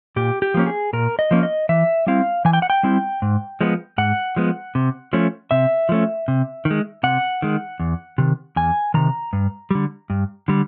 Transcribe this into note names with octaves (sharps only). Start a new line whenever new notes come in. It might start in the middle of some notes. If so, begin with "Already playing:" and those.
A#2 G4
G4
F3 A#3 C#4
G#4
A#2 A#4
D#5
F3 A#3 C#4
D#5
E3 E5
G3 C4 E4 F5
E3 G#5
G5
F#5
G5
G3 C4 E4
G#2
F3 G#3 B3
G#2 F#5
F3 G#3 B3
C3
F3 A3 C#4
C3 E5
F3 A3 C#4
C3
D#3
G#3
C3 F#5
D#3 G#3
E2
C3 D#3
E2 G#5
C3 D#3 A#5
G2
D3 G3
G2
D3 G3